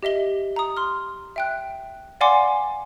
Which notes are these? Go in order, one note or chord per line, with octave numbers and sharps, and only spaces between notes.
G4 D#5 E5 G7
A#5 D#6
C6 F6
E5 G5 F#6
D5 F5 F#5 G#5 C6 D6